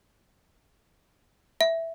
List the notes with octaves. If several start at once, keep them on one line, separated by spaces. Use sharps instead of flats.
E5